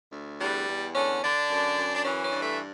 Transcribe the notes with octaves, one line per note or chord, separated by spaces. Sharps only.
D2
E2 G3
E2
D3 C#4
D3 D4
F#2
F#2
D4
E3 C#4
C#4
G2
A3